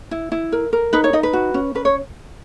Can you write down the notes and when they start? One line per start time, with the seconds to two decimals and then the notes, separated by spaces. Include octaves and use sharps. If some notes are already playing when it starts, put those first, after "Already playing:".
0.11 E4
0.32 E4
0.52 A#4
0.73 A#4
0.93 D#4 B4
1.04 C#5
1.13 D#4 D#5
1.23 B4
1.33 F#4
1.54 C#4
1.75 C#4 B4
1.85 C#5